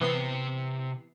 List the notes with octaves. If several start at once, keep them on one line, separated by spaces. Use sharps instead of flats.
C3 E3 B3 C5 C7